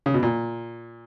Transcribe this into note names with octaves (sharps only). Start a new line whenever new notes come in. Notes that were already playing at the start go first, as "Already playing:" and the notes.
C#3
B2
A#2